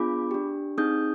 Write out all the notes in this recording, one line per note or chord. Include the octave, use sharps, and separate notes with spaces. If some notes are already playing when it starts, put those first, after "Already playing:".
Already playing: B3 D4 F4 G#4 B5 D6
D4 G4
C4 D#4 G#4 D#6 G6